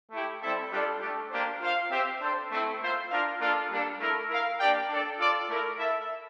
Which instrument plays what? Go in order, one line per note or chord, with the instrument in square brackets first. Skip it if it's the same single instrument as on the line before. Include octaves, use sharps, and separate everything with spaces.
[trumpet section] A3 E4 G4
G3 C4 E4 A4 E5
G3 D4 F4 A4 D5
A3 D4 G4
A#3 D4 G4 C5
F4 C5 F5
C4 G4 C5 E5
D4 A4 C5
A3 C4 E4
A#3 F4 C5 E5
D4 F4 A#4 F5
A#3 D4 F4 A4 D5
G3 A#3 D4 A4
A3 E4 A#4
E4 A#4 F5
A#3 D4 G4 D5 G5
D4 A4 D5
F4 A4 D5
A3 E4 A#4
E4 A4 E5